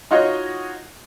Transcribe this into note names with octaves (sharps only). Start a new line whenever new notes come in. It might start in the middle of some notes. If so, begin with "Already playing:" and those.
D#4 F4 F#4 C#5 D#5